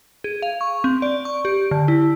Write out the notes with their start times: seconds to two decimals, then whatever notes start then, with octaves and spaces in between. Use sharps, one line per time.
0.24 G#4
0.42 F5
0.61 C#6
0.84 C4
1.02 D5
1.25 C#6
1.45 G4
1.71 D3
1.88 E4